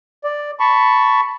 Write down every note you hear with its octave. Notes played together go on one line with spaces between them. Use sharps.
D5
A5 B5 C#6